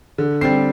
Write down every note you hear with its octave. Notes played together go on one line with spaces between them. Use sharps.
D3
G3 C4 C7